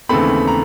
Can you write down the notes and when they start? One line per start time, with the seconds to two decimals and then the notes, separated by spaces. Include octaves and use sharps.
0.09 D#2 C#3 E3 A3 C4 B5
0.47 A#5